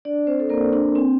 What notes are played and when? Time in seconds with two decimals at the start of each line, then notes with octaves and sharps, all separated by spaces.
0.05 D4 D5
0.27 C4 C5
0.40 A4
0.50 A#3 A#4
0.73 D4
0.95 C4